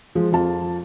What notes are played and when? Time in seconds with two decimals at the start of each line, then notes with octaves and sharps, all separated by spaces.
0.15 F3 G#3
0.32 F2 F4 A5